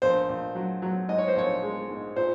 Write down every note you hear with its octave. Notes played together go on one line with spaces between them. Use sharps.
A#1 C5
A#1
F#3
F#3
G#2 D#5
C#5
C5
A#1 C#5
G#3
G#2
A#2 C5